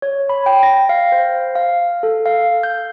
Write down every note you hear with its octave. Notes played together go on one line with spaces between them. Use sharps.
C#5
B5
G5
A#6
F5
C5
F5
A4
F5
G6